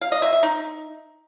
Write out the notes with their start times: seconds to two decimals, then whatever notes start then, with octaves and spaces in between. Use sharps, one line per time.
0.01 F5
0.12 D#5
0.22 E5
0.32 E5
0.43 D#4